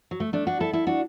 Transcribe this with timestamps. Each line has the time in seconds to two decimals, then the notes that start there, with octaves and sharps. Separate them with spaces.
0.11 F#3
0.20 A3
0.33 A3 D4
0.47 D4 F#4
0.60 E4 A4
0.73 E4 A4
0.87 D4 F#4